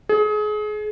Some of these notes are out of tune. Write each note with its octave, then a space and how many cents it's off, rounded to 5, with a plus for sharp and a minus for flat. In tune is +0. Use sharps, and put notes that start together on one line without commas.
G#4 +30